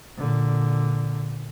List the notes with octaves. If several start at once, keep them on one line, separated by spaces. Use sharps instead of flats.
A#2 D3